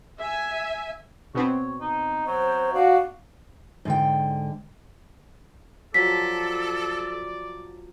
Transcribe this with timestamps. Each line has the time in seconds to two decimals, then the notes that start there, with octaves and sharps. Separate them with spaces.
0.19 E5 G#5
1.35 B2 B3 C4 C#5
1.80 D#4
2.27 F#3 C5
2.74 D4 F#4 F5
3.85 G#2 D3 G5
5.94 F3 F#3 G4 A4 D5 B6